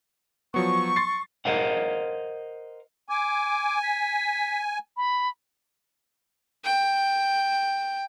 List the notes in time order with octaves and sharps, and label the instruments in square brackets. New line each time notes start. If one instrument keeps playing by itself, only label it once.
[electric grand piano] F3 F#3 B3 [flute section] C#6
[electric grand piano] C6 A6 C7
[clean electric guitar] A#4 C5 D#5 F5 F#5
[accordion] G#5 [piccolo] D6
[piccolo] B6
B5
[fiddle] G5